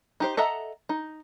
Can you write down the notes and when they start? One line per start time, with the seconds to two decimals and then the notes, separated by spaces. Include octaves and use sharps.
0.20 D#4 G4 C5
0.37 A4 D#5 E5 F#5 A#5
0.89 D#4